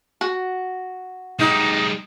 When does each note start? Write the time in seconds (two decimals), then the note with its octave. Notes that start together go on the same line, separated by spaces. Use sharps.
0.21 F#4
1.39 G#3 D#4 G4